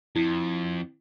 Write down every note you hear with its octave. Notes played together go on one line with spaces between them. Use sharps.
F2 E4